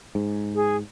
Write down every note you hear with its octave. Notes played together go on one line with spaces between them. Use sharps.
G#2
G#4